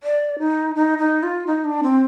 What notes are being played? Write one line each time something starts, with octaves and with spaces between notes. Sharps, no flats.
D5
D#4
D#4
D#4
F4
D#4
D4
C4